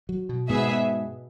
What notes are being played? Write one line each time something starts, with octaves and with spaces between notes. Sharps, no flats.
F#3
B2
G#2 B2 B3 G#4 E5